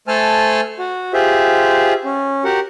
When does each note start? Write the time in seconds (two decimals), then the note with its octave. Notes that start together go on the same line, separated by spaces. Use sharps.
0.08 A3 A4 C5 G#5 A5 F6
0.79 F#4
1.14 F4 G4 G#4 C5 E5
2.05 C#4
2.44 F#4 G4 A#4 F#5